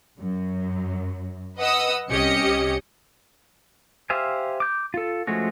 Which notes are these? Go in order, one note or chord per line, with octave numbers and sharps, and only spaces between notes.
F#2
B4 D#5 F#5 D#6 E6
C2 C#4 G4 D#5 C#7
G4 C5 E5 F5 G#5
D6 G6
F4 A4
F3 G#3 A3 C#4 F#4